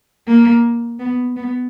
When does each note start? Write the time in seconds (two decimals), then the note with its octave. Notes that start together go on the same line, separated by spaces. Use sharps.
0.27 A#3
0.99 B3
1.36 B3